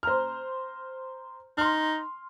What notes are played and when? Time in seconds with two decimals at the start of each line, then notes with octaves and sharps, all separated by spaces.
0.03 C5 A#5 F6
1.58 D#4 C6 F6